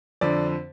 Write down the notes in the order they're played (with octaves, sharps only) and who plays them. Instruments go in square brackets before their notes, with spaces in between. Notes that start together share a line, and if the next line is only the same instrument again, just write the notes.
[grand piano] F2 D3 D5